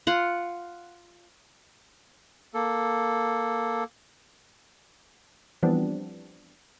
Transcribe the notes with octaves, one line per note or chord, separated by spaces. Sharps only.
F4 F#5
A#3 A4
E3 F3 G3 B3 C4 D4